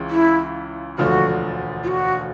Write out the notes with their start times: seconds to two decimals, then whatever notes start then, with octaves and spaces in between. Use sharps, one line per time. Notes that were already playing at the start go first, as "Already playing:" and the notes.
Already playing: C#2 C#3 E3
0.10 E4
0.98 E1 D2 D3 F3 F#4
1.83 F4
1.87 F#4